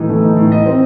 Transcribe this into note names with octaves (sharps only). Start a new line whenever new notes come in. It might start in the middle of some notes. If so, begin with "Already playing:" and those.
Already playing: A2 E3 D#4
A3
D#4
A2
D#5
C4